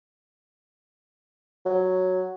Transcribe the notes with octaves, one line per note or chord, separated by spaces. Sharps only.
F#3